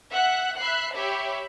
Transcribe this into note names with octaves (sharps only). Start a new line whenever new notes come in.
E5 F#5 F#6
E5 B5 F#6 C7
G4 C#5 E5 B5